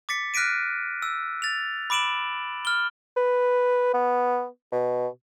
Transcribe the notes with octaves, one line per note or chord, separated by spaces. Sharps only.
D6 A6 B6 C#7
F6 F#6 A#6 B6 D7 D#7
E6
A6 F7
B5 D6 D7 E7 F#7
F6 G7
B4
B3
B2